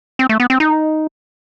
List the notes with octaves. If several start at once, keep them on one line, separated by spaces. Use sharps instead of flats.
C4
A3
B3
C4
D#4